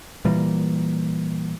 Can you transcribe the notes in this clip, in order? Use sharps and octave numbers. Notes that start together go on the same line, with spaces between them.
A#2 E3 G3 A#3